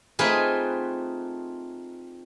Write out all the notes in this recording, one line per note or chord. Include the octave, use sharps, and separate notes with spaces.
A3 C4 D#4 F4 G#4 B4